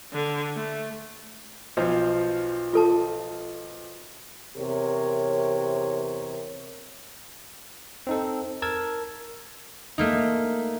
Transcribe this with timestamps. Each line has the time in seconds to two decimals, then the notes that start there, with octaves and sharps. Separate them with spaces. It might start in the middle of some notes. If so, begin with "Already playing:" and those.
0.13 D3
0.56 A3
1.77 B1 F3
2.73 F4 A4 A5
4.56 E2 C3 G4 A#4 C#5
8.07 C4 D#4 A4
8.62 A#4 A5 E6 G#6
9.98 A3 A#3 D#4